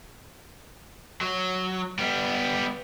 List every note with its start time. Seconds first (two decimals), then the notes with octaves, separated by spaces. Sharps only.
1.21 F#3
1.99 G3 B3